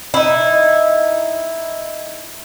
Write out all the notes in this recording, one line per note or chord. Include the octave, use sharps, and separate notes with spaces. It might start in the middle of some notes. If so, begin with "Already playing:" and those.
D#4 E4